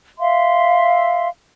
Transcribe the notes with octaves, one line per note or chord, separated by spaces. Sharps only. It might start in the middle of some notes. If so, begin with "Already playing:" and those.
E5 F5 C6